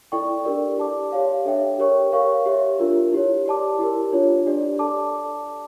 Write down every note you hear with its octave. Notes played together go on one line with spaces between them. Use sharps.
E4 A4 D5 G5 C#6
D4 G4 A#4 D5
G4 D5 A5 D6
G4 C#5 F5
D4 A4 C#5 E5 G5
G4 A#4 C#5 G5 C#6
A#4 C#5 F5 C#6
G4 C#5 E5
D4 F4 A#4
E4 G4 C#5
G4 D5 A5 D6
E4 G4 A#4
D4 F4 C#5
D4 G4 D5
A4 D5 A5 D6